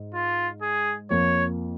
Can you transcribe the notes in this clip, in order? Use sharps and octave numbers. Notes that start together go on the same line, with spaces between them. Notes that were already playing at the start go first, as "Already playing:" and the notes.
Already playing: G#2
F4
G#4
F2 F3 A#3 C#5